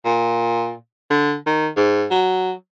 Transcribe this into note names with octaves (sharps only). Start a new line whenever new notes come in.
A#2
D3
D#3
G#2
F#3